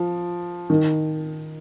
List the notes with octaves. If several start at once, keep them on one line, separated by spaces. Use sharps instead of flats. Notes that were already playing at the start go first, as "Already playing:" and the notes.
Already playing: F3
D#3